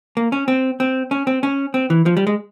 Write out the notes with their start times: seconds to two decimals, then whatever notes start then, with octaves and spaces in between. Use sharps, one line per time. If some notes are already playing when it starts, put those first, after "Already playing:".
0.17 A#3
0.32 C#4
0.48 C4
0.80 C4
1.11 C#4
1.27 C4
1.43 C#4
1.74 C4
1.90 E3
2.06 F3
2.17 G3
2.27 G#3